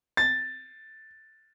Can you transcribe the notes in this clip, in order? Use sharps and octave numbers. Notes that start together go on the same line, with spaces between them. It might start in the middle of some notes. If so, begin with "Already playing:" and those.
A6